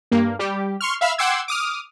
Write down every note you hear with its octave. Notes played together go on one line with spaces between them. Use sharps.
G2 A#3
G3 G4
C6 C#6 F6
E5 F5 B5 E6 F6
F#5 G5 C6 D6 E6 G#6
D6 D#6 F6